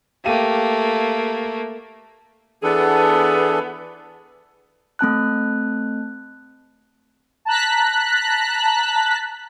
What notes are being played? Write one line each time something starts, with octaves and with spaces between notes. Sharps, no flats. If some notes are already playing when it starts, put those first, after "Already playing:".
A3 A#3 G4 F5 D#7
E3 B3 D4 G#4 A4
A3 C4 A5 F#6
A5 A#5 F#6 B6